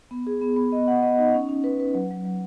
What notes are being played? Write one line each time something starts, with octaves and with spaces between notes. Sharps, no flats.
B3
G#4
B3
B3
D#5
F#5
D#5
D#4
C#4
C#4
B4
B4
F#3
F#3
F#3